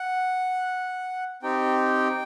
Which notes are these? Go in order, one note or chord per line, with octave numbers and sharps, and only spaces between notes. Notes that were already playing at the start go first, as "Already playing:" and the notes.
Already playing: F#5
C4 D#4 G4 G5